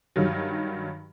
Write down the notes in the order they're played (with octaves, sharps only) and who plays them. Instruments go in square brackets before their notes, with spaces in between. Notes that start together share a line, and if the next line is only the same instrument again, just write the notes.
[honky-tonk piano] G2 D#3 F#3